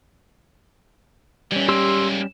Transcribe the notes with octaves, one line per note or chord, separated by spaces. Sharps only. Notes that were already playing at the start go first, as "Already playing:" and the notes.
E3 G3 C#4
G#3 A#3 G4 C6 E6